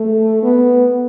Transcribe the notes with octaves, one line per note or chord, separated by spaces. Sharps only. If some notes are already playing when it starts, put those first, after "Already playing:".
Already playing: A3
B3